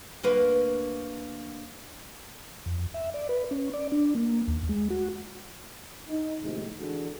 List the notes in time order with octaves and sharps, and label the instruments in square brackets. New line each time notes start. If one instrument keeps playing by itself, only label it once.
[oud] D2 A#3 B4
[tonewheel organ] F2
E5
D5
B4
C#4
D5
D4
A#3
D#2
G#3
F#4
[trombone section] D#4
D#2 A2 C3 F3 G#3
D3 E3 D4 F#4 G#4 A4